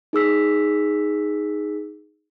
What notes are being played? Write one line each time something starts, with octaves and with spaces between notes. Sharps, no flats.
D#4 G#4 E6 B6